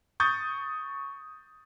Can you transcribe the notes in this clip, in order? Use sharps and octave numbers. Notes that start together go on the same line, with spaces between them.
C#6 D#6 G6 A6